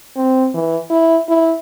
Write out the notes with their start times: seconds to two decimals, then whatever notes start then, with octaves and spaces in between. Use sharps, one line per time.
0.16 C4
0.54 E3
0.90 E4
1.29 E4